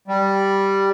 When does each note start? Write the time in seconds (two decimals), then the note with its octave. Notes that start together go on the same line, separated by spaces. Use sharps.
0.08 G3